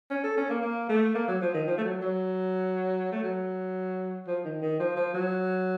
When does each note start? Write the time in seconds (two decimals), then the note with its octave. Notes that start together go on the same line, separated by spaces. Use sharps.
0.11 C#4
0.24 A4
0.37 C#4
0.50 A#3
0.62 A#3
0.89 A3
1.15 A#3
1.28 F#3
1.41 F3
1.54 D#3
1.67 F3
1.78 A3
1.84 F#3
2.02 F#3
3.12 A3
3.23 F#3
4.28 F3
4.45 D#3
4.62 D#3
4.80 F3
4.96 F3
5.14 F#3